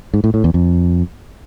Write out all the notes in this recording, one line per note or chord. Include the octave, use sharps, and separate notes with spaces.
G#2
A2
A2
E2
F2